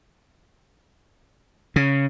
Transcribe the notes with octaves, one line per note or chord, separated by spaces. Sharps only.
C#3